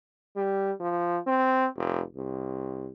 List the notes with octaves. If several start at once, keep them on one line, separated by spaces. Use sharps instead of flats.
G3
F3
C4
F1
C2